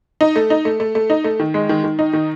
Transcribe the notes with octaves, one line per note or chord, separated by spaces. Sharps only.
D#4
A3
D#4
A3
A3
A3
D#4
A3
D#3
G#3
D#3
D#3
D#4
D#3